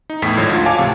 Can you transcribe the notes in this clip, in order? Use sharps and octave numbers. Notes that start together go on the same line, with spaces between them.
D#4
E2 A2 B6
G#1 G#2 F3 C#5 G#6
D2 F4
C#5 F5 G#5 A5 D6 G#6
A2 C3 F3